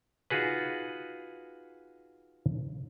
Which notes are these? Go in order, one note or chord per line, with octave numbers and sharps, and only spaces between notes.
D#4 F4 F#4 G#4 B4